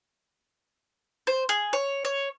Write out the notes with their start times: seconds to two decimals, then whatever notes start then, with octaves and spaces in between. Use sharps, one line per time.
1.27 C5
1.49 G#4
1.73 C#5
2.05 C#5